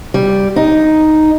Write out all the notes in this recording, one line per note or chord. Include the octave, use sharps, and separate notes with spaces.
G3
D#4